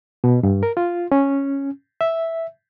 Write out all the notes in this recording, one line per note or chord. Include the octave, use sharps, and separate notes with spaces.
B2
G2
A#4
F4
C#4
E5